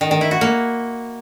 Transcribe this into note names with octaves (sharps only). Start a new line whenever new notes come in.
D#3
D#3
E4
F#4
A#3